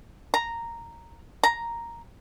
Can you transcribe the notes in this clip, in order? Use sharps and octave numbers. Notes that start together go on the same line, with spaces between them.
A#5
A#5